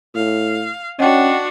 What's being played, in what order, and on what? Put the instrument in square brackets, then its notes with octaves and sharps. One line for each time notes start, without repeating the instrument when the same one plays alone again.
[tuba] A2 [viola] F5
[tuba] C#4 [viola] D4 F#4 [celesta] D#5 F#5 G5